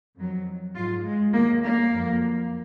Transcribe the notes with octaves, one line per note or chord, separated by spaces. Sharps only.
F2 D#3 F#3
G#2 F#3 F4
G#3
D#2 D#3 F#3 A#3
A#3
F2 D3 F#3